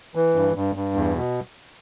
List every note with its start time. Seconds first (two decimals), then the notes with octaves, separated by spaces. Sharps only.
0.15 E3
0.35 G2
0.55 G2
0.76 G2
0.95 E2
1.15 B2